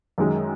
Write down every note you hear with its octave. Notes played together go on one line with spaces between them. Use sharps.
F#2 D#3 G#3